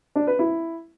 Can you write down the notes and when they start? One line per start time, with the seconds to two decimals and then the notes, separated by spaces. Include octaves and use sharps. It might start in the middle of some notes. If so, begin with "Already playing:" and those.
0.16 D4
0.27 B4
0.39 E4